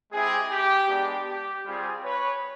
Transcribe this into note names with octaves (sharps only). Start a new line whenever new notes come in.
G#3 C4 E4 G4 G#4
G4
G#3 B3 D4 G4
G4
G3 C4 F4 G#4
B4 C#5